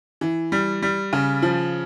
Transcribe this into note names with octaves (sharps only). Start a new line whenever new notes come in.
E3
G3
G3
C#3
F3